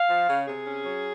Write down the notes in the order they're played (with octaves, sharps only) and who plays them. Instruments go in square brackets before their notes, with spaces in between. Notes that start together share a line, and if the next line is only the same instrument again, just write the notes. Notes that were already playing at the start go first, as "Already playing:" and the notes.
Already playing: [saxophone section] F5
F3
C#3
C3 G#4
C#4
F#3